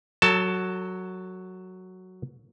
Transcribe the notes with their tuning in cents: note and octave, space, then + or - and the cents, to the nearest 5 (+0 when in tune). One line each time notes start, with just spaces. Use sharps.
F#3 +0 A4 +30 A5 +0